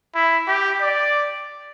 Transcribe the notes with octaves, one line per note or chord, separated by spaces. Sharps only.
E4
G4
D5